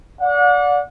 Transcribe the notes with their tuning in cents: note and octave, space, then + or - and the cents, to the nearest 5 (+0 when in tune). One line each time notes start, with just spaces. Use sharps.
D5 -20 F#5 -35